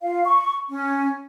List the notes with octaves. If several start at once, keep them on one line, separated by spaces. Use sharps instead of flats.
F4 F5
C#6
C#4